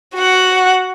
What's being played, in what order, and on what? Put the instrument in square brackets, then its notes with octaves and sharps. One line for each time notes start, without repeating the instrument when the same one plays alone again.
[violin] F#4 F#5